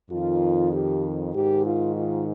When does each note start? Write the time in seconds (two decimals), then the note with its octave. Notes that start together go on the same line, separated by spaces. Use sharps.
0.11 F2 D#3 F4
0.72 G4
1.35 G#2 D#3 G4
1.66 F4
1.96 F4